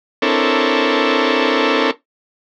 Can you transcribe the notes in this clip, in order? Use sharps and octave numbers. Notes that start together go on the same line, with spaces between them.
C4 D4 E4 A4 A#4 C#5